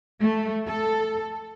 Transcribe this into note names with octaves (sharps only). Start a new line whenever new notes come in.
A3
A4